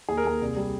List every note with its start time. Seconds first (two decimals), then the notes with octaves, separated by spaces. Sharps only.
0.09 D#2 G#4
0.17 A#4
0.24 D#2 G#4
0.42 C2
0.57 G3